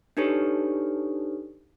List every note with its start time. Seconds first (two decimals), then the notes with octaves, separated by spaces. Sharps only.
0.17 D4 D#4 G4 A4 B4 C#5